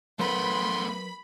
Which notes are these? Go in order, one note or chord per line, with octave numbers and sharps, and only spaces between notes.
F#3 A3 B3 A#4 B4 B5 C6